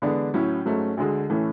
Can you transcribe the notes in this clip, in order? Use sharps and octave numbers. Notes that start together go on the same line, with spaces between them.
E2 D3 G#3 B3 D4
A2 F#3 C#4 E4
G#2 F#3 A3 C#4
D2 D3 G#3
A2 E3 A3 C#4